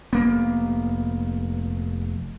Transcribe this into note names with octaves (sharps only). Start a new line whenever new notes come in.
F1 A#3 B3